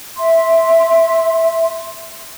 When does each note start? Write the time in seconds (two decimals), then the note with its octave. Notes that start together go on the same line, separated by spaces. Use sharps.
0.16 E5 C6